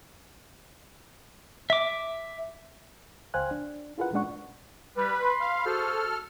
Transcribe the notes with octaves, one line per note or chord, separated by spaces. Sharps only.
E5 D6
C#2 C5 F5 G5 G#5 F#6
D4
E4 F4 G#4 A#4 B4 F#5
A#2 G#3 C#4 D4 F#5 C#6
G3 B4
B5 C6
F5
F#4 G#4 A4 C5 F6